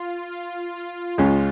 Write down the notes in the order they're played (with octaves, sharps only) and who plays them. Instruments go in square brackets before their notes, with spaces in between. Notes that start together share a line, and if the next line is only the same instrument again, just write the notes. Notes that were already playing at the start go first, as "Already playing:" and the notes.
Already playing: [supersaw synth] F4
F4
F4
[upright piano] C#2 C#3 G#3 C#4